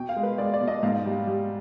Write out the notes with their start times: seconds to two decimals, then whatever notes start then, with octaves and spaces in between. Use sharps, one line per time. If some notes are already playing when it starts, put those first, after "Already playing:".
Already playing: B2 G5
0.09 F5
0.16 G#3
0.23 B4
0.38 G#3 D5
0.54 D5
0.61 B2
0.68 D#5
0.83 G#2 F5
1.06 G3
1.27 G3